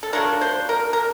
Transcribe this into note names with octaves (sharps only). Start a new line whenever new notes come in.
A4
F#3 A3 D4 F4 A#4
C5
A#4
A#4